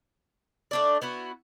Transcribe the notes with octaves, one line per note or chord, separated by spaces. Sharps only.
A3 D4 D5
B3 E4 F#4